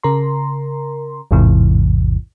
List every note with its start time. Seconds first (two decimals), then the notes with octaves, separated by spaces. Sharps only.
0.03 C#3 A#4 A#5 C6
1.31 A1 E2 G#2 C3 E3